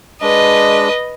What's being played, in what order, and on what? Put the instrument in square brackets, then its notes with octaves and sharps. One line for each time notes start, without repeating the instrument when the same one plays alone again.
[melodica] G#3 D4 [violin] B4 D#5